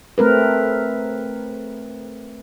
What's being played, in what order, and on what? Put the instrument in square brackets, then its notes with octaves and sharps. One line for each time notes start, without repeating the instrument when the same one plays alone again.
[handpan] A3 C4 A#4 B4